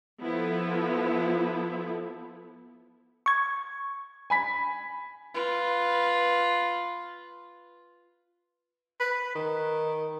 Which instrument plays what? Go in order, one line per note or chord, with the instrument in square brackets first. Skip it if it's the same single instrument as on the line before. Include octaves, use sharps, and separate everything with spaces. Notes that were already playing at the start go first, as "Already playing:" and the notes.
[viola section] F3 B3 E4 A4
[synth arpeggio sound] C#6 G#6
[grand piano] G#5 B5 B6
[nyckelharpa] F4 B4
[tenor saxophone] B4
D#3